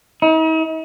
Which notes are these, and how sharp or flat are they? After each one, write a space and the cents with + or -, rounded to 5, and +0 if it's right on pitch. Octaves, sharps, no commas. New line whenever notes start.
D#4 +45